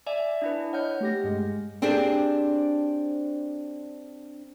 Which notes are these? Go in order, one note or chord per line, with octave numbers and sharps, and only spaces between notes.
D5 E5 G#5
D4 E4 B4
C#5 D#5 F#5 B5 F6 G6
A3 G4 A#6
G2 G#3
C4 D4 G4 G#4 C5 D5